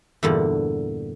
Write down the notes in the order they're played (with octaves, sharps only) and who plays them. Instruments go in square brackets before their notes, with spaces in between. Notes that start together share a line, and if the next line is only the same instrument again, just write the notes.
[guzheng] E2 G2 A#2 D3